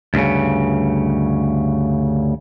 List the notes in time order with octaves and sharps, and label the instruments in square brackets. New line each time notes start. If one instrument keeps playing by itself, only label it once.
[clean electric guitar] D2 G2 A#2 C#3